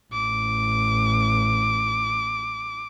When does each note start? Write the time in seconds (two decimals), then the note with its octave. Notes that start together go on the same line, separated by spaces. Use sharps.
0.13 A1 D6